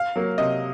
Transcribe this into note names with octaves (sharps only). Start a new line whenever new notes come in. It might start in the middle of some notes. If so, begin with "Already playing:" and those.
Already playing: F5
F#3 A#3
C3 D#5